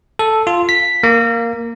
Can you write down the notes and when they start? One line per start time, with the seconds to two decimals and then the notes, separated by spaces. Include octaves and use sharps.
0.19 A4
0.47 F4
0.69 B6
1.03 A#3